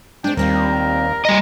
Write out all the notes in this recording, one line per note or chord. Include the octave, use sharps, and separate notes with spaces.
G#3 C4 D4 G5
D#2 G3 C4 F4 A#4
G3 D#5 A#5